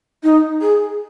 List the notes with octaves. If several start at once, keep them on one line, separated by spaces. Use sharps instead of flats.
D#4
G#4